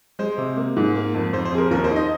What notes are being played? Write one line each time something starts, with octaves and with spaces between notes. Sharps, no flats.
G#3 C5
C3
A#3
G#2
A#3
F2
F2 C5
C5
F2 G#4
A#4
D#2 A#4
C5
D#4
D#5